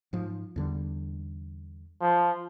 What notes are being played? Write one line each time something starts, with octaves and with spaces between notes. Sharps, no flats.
G#2 F3
E2 D3 G3
F3